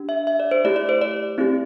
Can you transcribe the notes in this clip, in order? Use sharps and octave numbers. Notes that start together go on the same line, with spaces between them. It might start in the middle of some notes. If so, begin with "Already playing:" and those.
Already playing: D4 G4
E5
E5
D5
C5
A3 E4 G4 D5
D5
C5
D5
C4 E4 G4